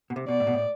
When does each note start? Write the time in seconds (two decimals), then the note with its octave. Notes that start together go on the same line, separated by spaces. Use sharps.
0.10 B2
0.16 C3
0.28 B2 D5
0.40 A2
0.47 B2
0.53 A2